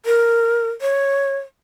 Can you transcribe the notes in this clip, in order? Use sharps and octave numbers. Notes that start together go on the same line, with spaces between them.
A#4
C#5